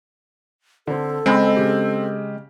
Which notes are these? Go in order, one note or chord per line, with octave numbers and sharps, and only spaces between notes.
D3 C4 A4
C#2 G#3 C4 G#5 B5
C#3 G4